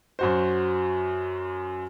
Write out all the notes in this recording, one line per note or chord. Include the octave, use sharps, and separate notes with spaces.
F#2 F#4 C5